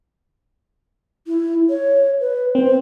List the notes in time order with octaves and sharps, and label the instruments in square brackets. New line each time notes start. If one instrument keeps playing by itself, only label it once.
[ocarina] E4
C#5
B4
[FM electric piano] C4 [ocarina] C5